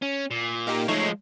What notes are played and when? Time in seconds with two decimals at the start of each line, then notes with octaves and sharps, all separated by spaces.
0.02 C#4
0.30 A#2
0.67 A#3 D#4 G4
0.88 F3 G#3 A3 D#4 C#5